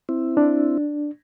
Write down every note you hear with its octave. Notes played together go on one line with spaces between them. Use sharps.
C4 E4
D4